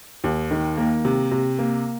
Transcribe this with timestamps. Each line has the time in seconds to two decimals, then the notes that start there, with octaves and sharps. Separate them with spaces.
0.24 D#2
0.51 D#3
0.77 A#3
1.05 C3
1.31 C3
1.59 A#3